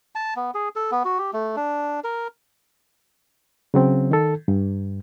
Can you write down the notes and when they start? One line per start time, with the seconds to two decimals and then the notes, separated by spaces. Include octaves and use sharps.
0.15 A5
0.36 B3
0.54 G#4
0.76 A4
0.91 B3
1.05 F#4
1.19 G4
1.33 A3
1.56 D4
2.04 A#4
3.74 C#3 F#3 C4
4.11 D#3 A4
4.48 G2